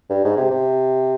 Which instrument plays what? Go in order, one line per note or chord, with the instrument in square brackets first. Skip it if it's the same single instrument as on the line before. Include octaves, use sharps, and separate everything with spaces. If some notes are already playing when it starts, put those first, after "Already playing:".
[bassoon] G2
G#2
C3
C3